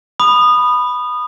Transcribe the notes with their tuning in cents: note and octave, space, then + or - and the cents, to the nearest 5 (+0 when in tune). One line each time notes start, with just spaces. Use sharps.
B5 +0 D#6 -20